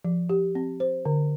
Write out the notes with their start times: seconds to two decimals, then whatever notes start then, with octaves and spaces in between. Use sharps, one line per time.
0.05 F3
0.30 G4
0.55 C4
0.80 C5
1.05 D3